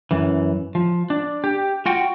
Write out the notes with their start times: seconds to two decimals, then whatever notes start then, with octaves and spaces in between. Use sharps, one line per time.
0.11 F#2 E3
0.75 F3
1.10 D4
1.44 G4
1.86 F4 F#4 G5